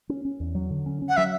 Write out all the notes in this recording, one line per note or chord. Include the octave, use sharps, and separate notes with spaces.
C#4
C#4
E2
F#3
D3
C#4
C#4
F#5
F#3 E5